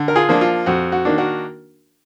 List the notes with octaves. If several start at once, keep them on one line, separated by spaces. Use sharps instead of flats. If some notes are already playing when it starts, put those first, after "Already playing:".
Already playing: D3
A#4
F4 G#4
F3 A#3 D4
F4
F2 F#4
F#4
D#3 A#3 D4
F#4 A#4